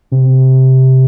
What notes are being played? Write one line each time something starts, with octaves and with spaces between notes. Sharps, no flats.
C3